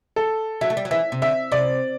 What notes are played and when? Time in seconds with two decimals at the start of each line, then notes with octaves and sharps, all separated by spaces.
0.16 A4
0.61 F#3 E5
0.70 A3
0.77 G3
0.85 F#3
0.91 E3 E5
1.12 C3
1.22 D3 E5
1.52 C3 D5